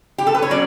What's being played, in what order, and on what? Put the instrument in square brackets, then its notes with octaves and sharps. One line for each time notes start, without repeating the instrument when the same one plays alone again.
[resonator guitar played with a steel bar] G4
A4
B4
C#5
B2 F#3 C#4 D5